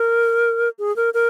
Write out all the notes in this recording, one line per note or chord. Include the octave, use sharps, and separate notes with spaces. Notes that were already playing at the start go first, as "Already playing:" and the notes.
Already playing: A#4
G#4
A#4
A#4